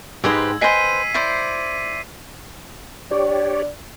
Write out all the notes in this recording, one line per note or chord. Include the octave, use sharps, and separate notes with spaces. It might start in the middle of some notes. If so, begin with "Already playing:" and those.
G#2 G#3 D#4 G4 B4 C5 E6 G#6
B4 C5 D#5 G5 G#5 B6 C7 D#7
D#7
E4 C5 D5
D4 G4 C#5 D5